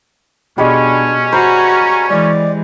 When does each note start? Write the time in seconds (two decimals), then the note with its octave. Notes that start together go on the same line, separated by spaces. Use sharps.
0.58 B2 G3 G#3 C#4 D4
1.33 F#4 C5 A#5 B5
2.09 E3 G#3 D5